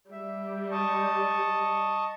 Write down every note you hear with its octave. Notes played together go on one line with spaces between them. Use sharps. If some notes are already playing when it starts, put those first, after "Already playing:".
G3 E5
D#5 A5 C#6